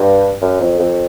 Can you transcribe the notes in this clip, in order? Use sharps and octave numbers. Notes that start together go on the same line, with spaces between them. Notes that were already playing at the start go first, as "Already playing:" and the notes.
Already playing: G2
F#2
F2
F2